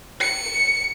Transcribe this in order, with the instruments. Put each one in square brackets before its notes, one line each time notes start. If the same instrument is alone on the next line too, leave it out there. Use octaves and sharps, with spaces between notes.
[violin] C#7